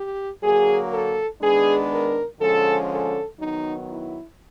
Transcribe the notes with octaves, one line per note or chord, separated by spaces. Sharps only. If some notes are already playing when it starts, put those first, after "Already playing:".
Already playing: G4
D3 F#3 A#3 G#4
A4
D#3 G#3 B3 D4 G#4
A#4
D3 F3 G#3 C#4 A4
A4
D#3 F#3 B3 D#4
E4